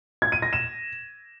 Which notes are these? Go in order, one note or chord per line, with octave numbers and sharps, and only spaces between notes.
G#6
D#7
A#6
E7